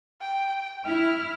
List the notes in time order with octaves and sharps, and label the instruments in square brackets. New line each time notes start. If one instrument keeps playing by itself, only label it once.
[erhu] G5
[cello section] E4 [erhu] F6